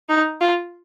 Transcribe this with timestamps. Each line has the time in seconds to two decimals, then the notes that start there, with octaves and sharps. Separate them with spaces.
0.09 D#4
0.41 F4